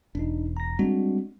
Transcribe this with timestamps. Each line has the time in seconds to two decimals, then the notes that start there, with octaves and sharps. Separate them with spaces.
0.15 E1 D4 D#4
0.57 A#5 A#6
0.79 G3 G#3 C4 D4 F#4